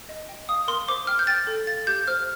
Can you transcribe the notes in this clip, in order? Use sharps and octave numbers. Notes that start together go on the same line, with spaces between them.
D#5
G5
F5 D#6
A#4 C6
C5 D6
G5 F6
G6
G5 A6
A4
F5 A6
G4 G6
C5 F6